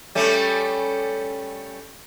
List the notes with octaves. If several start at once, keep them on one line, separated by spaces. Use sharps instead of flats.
G3 A3 C#4